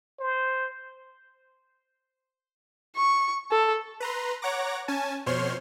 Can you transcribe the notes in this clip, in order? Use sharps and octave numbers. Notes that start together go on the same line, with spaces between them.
C5
C#6
A4
B4 A#5 C6
C#5 F#5 A#5 D6 A#6
C#4 G#5 A5
F2 B2 C5 C#5 C6 F6